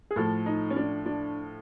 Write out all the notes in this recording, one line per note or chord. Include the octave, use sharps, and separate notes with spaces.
G#4
A2 F3 A3 A4
D#4
C#4
D4
D4